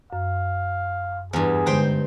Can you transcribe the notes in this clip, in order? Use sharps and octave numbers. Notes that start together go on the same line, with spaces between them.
F#2 F5
E2 G2 G#4
D3 G#3 D#4 C5 G5